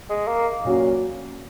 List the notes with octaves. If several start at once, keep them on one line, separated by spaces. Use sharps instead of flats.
G#3
A#3
A#2 F#3 C#4 F#4